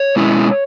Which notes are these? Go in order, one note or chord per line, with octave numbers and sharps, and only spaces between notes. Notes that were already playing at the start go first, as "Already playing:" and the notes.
Already playing: C#5
B2 G#3 C#4 E4